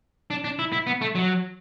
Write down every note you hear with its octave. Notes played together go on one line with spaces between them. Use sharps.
D4
D4
E4
E4
B3
A3
F#3